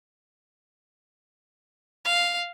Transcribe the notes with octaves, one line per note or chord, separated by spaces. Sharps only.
F5